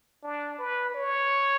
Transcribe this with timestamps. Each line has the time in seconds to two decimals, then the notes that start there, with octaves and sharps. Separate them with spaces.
0.23 D4
0.58 B4
0.94 C#5